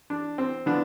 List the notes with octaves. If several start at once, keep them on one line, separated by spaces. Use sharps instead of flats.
D4
C4
D3 F3 B3 D4